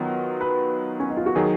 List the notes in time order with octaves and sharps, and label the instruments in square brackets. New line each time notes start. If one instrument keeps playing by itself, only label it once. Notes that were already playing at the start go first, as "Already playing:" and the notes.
Already playing: [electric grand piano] D#3 F#3 B3 F4
[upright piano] B4
C#4
D#4
F4
F#4
[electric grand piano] D#3 F#3 [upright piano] G#4